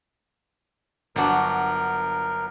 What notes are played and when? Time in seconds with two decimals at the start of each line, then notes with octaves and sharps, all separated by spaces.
1.16 G1 F#3 D4 F#4 A#4 F#5